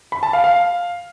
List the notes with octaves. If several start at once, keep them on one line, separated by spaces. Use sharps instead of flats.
B5
A5
F5
F5